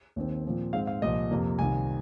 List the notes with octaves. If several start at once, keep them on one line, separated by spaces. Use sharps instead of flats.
D#2 D#3 C4
A#2 F3 C4
G#2 G#3 C4 F5
F5
C2 A#2 F3 D#5
F2 C3 F3 A#3
C2 C3 D#3 G#5